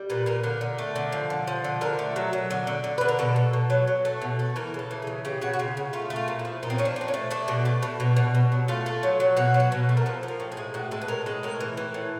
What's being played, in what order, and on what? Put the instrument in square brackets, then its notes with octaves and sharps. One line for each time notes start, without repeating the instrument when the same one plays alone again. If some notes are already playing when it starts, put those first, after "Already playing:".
Already playing: [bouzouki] G3
A#2 B4
A#2 A#4
D3 A#4
D3
A3
D3
F3
D3
F3
D3
D3 A#4
A3
F#3
F#3
D3
D3
D3
D3 B4
A#4
B2 A4
B2
B2
F#3
F#3
A3
B2
A3
E3 A#4
C#3 A4
E3
C#3 G#4
C#3 G4
C#3 F#4
F#4
C#3 F4
C#3
A3 F4
A3
F4
A#2
E4
F3
A#2 D#4
C4
F3 C#4
D4
F3 C4
C#4
A3
A3 D4
B2
A3
B2
B2
B2
B2
F#3
A3 F4
A3
F#3
F#3
B2 F#4
F#3
F#4
B2
A3
A#4
F3 A4
F3
A#4
A2
G#4
G#3
A2 F#4
G#3 A4
B4
A2 A#4
G#3 A4
A2 A#4
E3
E3
A2